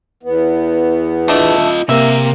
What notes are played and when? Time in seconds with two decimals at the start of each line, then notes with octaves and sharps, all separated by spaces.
0.23 E2 B3
1.28 A3 D4 F4 D#5
1.89 C3 A#3 E5